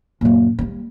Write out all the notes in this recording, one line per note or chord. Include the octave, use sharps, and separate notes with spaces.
F#2 A#2
G3 A#3